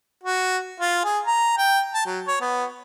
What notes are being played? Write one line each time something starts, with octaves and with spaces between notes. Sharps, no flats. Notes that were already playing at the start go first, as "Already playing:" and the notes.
F#4
F4
G#4
A#5
G5
A5
F#3
C#5
B3